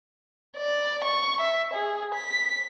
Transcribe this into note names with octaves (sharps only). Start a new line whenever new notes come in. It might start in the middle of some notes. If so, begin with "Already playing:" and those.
D5
C#6
E5
G#4
B6